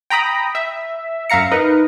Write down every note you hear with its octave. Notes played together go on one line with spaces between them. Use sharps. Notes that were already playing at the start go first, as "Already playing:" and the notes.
G5 A#5 B5 D#6
E5
F#2 E5 F5 A#5 C#7
D#4 A#4 B4